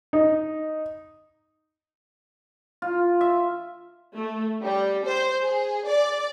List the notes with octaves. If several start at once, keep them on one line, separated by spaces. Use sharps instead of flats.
D#4
F4
E5
A3
G3
C5
G#4
D5